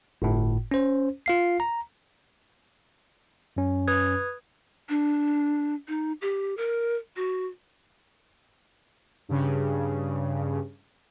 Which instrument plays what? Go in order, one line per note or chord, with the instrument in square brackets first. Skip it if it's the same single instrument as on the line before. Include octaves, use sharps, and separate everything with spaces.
[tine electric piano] G1 A2
C#4 C5
F4 F5 C7
A#5
F#2 C#4
[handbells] B4 D#6 G#6
[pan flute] D4
D#4
G4
A#4
F#4
[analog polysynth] G2 C#3